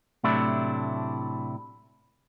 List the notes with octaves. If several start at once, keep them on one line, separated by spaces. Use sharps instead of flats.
A2 C3 F#3 A3 D4 E4